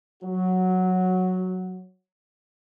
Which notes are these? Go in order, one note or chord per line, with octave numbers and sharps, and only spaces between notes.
F#3 F#4